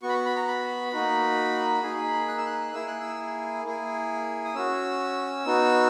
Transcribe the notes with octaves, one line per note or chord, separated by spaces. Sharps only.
B3 F#4 C#6
B5
C#6
B5
A#5
B5
A#3 D#4 F#4
A#3 D#4 G#4
F#6
E6
F#6
A#3 E4 G#4 E6
F#6
E6
A#3 E4 G#4
D#6
C#4 F#4 E6
B3 D#4 F#4